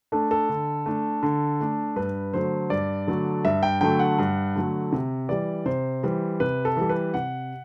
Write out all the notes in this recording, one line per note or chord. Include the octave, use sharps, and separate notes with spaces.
A3 D4 A4
A4
D3
A3 D4
D3
A3 D4
G2 B4
D3 F#3 A3 C5
G2 D5
D3 F#3 A3
G2 E5
G5
D3 F#3 A3 G5
F#5
G2
D3 F#3 A3
C3
E3 G3 D5
C3 C5
E3 G3
C3 B4
A4
E3 G3
B4
C3 F#5